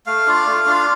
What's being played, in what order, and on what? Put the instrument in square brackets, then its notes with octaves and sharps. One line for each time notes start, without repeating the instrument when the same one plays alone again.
[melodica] A3 F5
D4 F4
A3
D4 F4